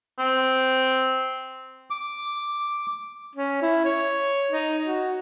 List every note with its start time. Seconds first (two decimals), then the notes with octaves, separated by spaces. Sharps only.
0.19 C4
1.90 D6
3.36 C#4
3.62 E4
3.85 C#5
4.51 D#4
4.87 F#4